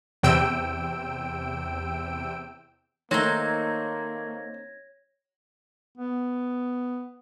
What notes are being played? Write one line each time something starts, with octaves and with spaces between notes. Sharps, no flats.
E2 C3 G5 E6 D7
D#3 A3 A#3 C4 D#4 C#5 G#6 A#6
B3